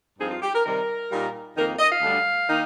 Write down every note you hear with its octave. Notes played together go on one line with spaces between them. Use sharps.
G2 F3 C4 D#4 G#4
F4
G4
A#4
C3 D#3 G3 A#4
A#2 G3 A#3 D#4
F2 D#3 A#3 D#4 A#4
D#5
F5
D2 D3 G3 D4
D#3 A#3 D#4